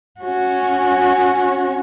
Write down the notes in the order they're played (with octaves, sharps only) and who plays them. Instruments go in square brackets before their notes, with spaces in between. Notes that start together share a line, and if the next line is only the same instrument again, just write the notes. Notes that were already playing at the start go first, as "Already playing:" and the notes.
[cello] C#4 F#4